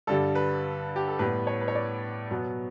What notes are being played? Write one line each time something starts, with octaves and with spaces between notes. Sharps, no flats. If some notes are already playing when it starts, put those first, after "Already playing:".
G2 D3 G3 A4
B4
G4
A4
A2 G3 B3 B4
C#5
B4
C#5
D5
B2 F#3 B3